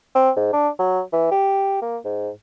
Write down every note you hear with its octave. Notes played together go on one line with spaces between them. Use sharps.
C4
G#2
D4
F#3
E3
G4
A#3
G#2